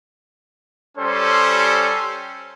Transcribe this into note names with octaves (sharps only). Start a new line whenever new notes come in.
G3 C#4 G4 A4 C5 C6